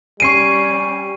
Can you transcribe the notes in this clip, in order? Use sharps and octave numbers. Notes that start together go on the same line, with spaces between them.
G3 C#4 C#6 C7 D7 D#7